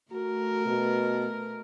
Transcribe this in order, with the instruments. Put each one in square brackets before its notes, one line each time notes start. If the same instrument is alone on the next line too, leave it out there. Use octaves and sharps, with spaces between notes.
[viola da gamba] A3 A#4 [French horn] F#4
[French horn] B2